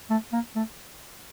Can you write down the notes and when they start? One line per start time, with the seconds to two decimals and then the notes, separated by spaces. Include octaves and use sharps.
0.10 A3
0.33 A#3
0.56 A3